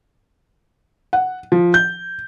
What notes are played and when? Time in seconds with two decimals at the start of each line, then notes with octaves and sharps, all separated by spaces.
1.13 F#5
1.52 F3
1.74 G6